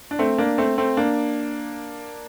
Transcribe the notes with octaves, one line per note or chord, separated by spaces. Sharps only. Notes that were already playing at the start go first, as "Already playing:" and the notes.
D4
A3 C4
A#3 D4
A3 C4
A3 C4
A#3 D4